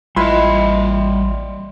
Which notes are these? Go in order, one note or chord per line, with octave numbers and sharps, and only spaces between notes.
A1 G3 E4 F4 B4 D#5 C6